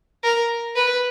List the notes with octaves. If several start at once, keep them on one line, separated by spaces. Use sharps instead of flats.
A#4
B4